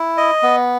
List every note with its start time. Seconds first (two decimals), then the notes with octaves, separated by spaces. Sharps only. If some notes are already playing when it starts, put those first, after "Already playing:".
Already playing: E4
0.17 D#5
0.43 B3